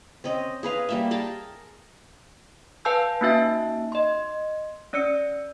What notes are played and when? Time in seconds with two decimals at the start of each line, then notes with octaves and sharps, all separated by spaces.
0.24 C4 C#4 D#5
0.63 G#4 B4 F5 A#5
0.89 G3 A#3 E5
1.11 G#4 A#4 G5 A5
2.85 B4 F5 G#5 A5 E6 G6
3.21 A#3 C#4 D#4 F#4 E5 A5
3.92 D#5 C6
4.93 C#4 D5 E6 C#7